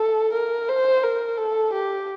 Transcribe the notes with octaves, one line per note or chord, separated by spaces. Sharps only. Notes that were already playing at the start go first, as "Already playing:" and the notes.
Already playing: A4
A#4
C5
A#4
A4
G4